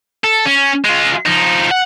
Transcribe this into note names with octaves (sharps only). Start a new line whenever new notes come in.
A4
C#4
G#3 F4
F3 D#4
F#5